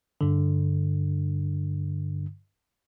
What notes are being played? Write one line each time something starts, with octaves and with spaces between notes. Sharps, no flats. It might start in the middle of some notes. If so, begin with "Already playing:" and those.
G2 D3